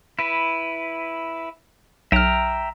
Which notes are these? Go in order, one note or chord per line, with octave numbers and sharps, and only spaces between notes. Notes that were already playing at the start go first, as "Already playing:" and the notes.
E4 B4
B1 E5 G5 A#5 F6